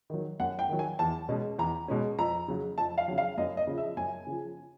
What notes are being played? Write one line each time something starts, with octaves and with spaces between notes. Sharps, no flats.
D#3 F#3
F#2 F#5
G5
D#3 F#3
G#5
E2 A5
B2 G#3 C#4
E2 A#5
B2 G#3 C#4
F2 A#5
C#3 F#3
F2 A5
F5
C#3 F#3
F5
F#2 D#5
D#5
C#3 F3
E5
F#2 G#5
C#3 F3